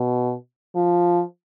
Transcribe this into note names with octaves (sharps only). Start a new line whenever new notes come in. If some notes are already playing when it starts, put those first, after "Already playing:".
Already playing: B2
F3